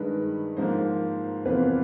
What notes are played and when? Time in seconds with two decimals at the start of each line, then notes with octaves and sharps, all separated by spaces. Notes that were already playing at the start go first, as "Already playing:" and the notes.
Already playing: G2 D#3 G#3 B4
0.57 G#2 F3 A#3 C5
1.45 E2 C3 F3 A#3 B4